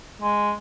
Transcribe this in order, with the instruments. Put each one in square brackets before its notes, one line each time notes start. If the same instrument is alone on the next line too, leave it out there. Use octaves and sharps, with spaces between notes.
[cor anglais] G#3